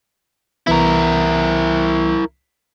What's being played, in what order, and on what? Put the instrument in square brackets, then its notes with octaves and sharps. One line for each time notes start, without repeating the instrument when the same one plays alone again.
[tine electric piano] C2 E3 B3 [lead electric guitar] E4 A#4